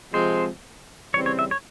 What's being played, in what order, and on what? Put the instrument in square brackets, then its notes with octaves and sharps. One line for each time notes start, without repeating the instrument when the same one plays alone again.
[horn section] C3 F3 G#3 C4 [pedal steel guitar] C5
[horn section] C#3 E3 G3 C4 [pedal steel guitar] C#5
[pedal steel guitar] C#5
E5
C#5